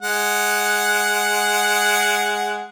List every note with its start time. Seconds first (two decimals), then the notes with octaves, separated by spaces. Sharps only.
0.01 G#3 F#5